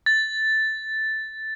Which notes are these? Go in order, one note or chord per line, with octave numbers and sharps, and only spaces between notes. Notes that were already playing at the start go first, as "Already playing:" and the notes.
A6